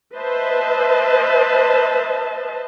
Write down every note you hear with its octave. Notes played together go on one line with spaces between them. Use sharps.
B4 C5 D#5 E5 A5